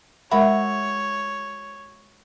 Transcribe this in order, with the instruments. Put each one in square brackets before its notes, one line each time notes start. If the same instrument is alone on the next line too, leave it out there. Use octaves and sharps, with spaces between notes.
[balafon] G#3 A#4 B5 [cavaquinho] F#4 [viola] C#5 [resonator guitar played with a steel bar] E5